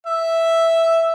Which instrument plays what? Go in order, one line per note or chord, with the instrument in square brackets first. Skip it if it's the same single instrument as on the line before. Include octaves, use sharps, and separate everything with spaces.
[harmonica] E5